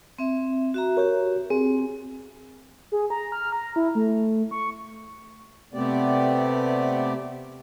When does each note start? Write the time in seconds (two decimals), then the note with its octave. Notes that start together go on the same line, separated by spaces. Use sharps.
0.19 C4 E5
0.74 F#4 E5 A#5
0.97 F#4 G4 A#4 C#5
1.50 C4 G#4
2.92 G#4
3.10 A#5
3.32 F6
3.52 A#5
3.76 E4
3.95 A3
4.51 C#6
5.74 C3 A3 B3 C4 G4 D5